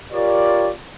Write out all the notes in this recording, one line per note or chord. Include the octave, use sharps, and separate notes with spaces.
F4 G4 A#4 C#5 D5